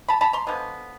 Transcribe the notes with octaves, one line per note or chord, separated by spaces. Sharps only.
A5 B5
A5 B5
A#5 C6
D3 F3 G#3 B3